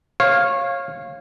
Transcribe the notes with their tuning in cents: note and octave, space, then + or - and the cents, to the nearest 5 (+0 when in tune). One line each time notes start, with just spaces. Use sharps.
C#5 -25 F5 +0